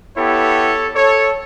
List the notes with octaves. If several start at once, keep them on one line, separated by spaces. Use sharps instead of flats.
B3 E4 G4 A4 C#5
A4 C#5